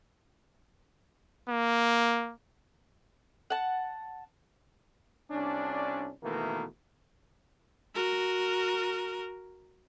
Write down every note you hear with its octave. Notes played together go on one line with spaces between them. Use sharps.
A#3
F#5 A5
C2 C#4 D4
B2 D#3 E3 A3 A#3
F#4 A#4